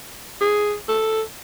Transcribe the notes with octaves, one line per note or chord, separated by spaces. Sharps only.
G#4
A4